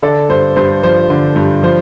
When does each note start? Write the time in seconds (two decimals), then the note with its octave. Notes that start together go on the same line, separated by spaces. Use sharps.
0.02 D3 A4 D5
0.29 G2 C5
0.56 G2 C5
0.83 F3 C5
1.10 D3
1.36 G2
1.63 F3 C5